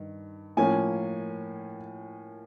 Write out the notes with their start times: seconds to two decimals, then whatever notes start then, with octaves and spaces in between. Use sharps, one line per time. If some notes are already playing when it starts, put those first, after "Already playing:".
Already playing: G2 D#3
0.57 A2 F3 A#3 C#4 G#5